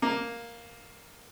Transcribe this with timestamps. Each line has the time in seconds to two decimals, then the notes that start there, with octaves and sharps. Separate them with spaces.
0.02 A#3